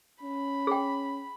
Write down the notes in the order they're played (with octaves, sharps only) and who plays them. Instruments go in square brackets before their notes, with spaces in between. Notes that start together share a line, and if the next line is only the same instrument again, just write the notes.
[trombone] C#4 [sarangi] B5
[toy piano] G#4 G5